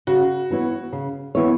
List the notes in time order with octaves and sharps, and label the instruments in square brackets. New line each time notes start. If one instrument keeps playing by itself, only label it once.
[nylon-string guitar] C#3 [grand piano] F#4
[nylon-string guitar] E3 B3 E4 C#5
C#3
E3 B3 E4 C#5